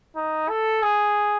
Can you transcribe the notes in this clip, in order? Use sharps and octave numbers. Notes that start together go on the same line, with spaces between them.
D#4
A4
G#4